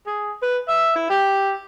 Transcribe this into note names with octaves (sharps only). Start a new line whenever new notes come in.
G#4
B4
E5
E4
G4